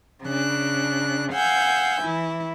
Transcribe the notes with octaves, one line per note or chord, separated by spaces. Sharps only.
C#3 D4 F#6
F5 F#5 G#5 E6 G6
E3 E4